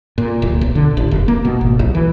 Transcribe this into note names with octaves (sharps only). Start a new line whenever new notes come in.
A#2
D1
B1
D3
A1
F1
A#3
B2
G#1
B1
E3